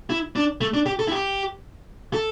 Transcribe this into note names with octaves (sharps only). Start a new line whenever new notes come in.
E4
D4
A3
D4
G4
A4
E4
G4
A4